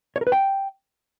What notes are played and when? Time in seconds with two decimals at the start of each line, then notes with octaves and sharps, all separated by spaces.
0.16 C#5
0.21 A#4
0.27 B4
0.32 G5